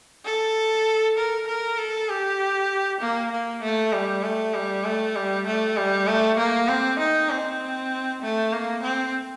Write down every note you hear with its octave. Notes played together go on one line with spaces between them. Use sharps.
A4
A#4
A#4
A4
G4
A#3
A#3
A3
G3
A3
G3
A3
G3
A3
G3
A3
A#3
C4
D#4
C4
A3
A#3
C4